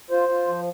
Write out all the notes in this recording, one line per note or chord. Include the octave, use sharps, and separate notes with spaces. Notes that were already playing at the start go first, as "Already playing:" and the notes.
F4 C5
F4
F3